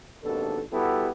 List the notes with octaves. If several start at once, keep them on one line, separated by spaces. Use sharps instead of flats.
G#1 D#2 B2 D4 A4
G3 B3 E4 F#4 G4 A4